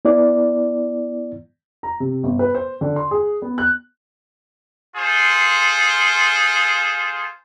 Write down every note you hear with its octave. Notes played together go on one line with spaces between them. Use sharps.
B3 E4 D5
A#5
C3
G1
B4
C5
D3
C6
G#4
B3
F#6
F4 G#4 A4 C5